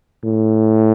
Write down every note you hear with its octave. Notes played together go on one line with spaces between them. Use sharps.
A2